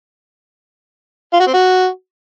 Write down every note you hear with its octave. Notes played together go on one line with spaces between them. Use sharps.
F4
F#4
C4
F#4